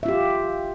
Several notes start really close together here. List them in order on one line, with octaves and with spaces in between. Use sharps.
E5 F4 G4